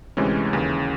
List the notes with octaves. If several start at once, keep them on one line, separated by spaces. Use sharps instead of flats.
D2 C3 E3 G#3 C#4
D#2 C#3 E3